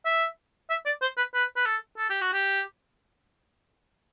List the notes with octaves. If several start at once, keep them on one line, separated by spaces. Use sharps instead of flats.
E5
E5
D5
C5
B4
B4
B4
A4
A4
G4
F#4
G4